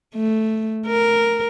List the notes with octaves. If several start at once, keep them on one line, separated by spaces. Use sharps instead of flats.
A3
A#4